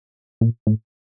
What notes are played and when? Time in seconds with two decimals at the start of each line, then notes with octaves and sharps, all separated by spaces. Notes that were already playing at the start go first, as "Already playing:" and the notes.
0.41 A#2
0.67 A2